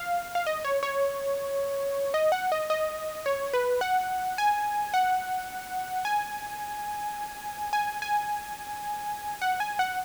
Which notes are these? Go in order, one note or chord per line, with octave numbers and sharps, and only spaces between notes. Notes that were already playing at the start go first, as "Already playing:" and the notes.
Already playing: F5
F5
D#5
C#5
C#5
D#5
F#5
D#5
D#5
C#5
B4
F#5
G#5
F#5
G#5
G#5
G#5
F#5
G#5
F#5